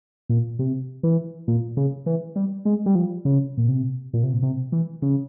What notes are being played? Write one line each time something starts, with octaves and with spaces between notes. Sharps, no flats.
A#2
C3
E3
A#2
C#3
E3
G3
G#3
G3
F3
C#3
A#2
C3
A#2
C3
A#2
C3
E3
C#3